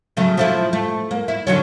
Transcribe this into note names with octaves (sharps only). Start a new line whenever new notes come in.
C#3 F#3 A3
F3 A3 E4
A3
A#3
E4
D3 F#3 C#4